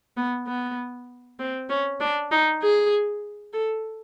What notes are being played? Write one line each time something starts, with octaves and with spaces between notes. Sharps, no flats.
B3
B3
C4
C#4
D4
D#4
G#4
A4